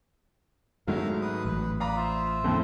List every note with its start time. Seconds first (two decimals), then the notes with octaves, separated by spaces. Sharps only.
0.88 G#1 G#2 F#3 A3 A#4 E5 F5
1.22 B4 D#6
1.45 A1 B4
1.80 D5 F5 A#5 B5 D#6
1.97 F4 C5 E5
2.44 F2 A2 F3